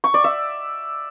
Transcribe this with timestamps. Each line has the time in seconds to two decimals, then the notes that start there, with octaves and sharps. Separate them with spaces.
0.04 C#6
0.14 D5
0.24 E5